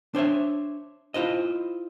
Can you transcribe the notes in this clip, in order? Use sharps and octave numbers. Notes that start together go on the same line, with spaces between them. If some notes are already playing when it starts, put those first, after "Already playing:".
D4 C5 C#5 E5
E4 F4 C5 D#5